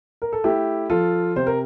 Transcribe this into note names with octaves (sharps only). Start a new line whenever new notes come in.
A#4
A4
A3 E4 G4
F3 F4 A4
C3 C5
A#4